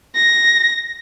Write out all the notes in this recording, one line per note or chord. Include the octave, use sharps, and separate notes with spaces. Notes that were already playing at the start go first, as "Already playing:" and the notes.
A#6